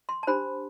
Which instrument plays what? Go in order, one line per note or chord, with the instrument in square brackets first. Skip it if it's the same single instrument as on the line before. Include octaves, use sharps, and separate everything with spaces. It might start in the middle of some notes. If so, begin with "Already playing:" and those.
[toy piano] C6
A5
D4 G4 C5 B5